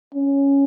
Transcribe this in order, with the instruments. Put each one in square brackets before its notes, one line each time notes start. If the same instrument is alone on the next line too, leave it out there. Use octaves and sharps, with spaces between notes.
[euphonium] C#4